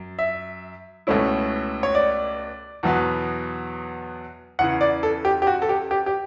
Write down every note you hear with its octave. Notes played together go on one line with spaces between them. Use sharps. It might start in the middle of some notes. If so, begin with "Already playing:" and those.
Already playing: F#2
E5
C#2 B2 A3 C#4 E4
C#5
D5
E2 B2 F#3 B3
E2 C#3 E3 F#5
D5
A4
G4
G4
F#4
A4
G4
G4
G4